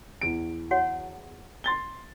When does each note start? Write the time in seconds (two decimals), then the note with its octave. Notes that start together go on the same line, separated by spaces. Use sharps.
0.21 E2 D7
0.71 F#4 C#5 F#5
1.64 C6 A6 G7